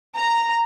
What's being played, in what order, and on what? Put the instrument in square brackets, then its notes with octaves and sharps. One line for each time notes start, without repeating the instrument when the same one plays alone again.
[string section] A#5